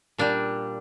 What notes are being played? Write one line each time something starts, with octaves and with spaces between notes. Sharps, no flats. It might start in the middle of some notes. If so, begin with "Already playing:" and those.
A#2 G3 D4